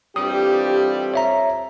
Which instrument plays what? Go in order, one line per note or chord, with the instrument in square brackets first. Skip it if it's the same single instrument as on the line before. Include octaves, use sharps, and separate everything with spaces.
[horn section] G2 E3 G3 [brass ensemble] C4 F4 A4 [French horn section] G4 [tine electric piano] D#6
[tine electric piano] C#5 E5 A#5